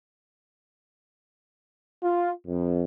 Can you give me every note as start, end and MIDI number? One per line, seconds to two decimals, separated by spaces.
2.03 2.29 65
2.47 2.82 41